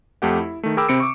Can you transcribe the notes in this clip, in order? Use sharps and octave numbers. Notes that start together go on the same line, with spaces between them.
F2 A3 G4 F#5
E4
D#3 A3
G#4 A#4 G5 B5 D6 E6
C3 C4 B5 C#7 D7
C#6 D6